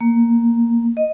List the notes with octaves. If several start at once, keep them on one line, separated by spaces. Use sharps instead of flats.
A#3
D#5